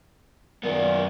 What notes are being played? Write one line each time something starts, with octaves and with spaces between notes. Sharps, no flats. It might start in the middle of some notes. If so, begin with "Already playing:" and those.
F#2 A#2 B3